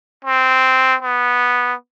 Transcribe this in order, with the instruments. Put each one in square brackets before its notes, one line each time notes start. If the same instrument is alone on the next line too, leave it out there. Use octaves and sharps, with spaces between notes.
[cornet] C4
B3